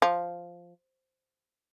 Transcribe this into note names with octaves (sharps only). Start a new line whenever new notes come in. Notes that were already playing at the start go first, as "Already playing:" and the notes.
F3